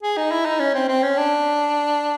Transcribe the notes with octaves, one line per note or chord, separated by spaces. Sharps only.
G#4
D#4
E4
D#4
C#4
C4
C4
C#4
D4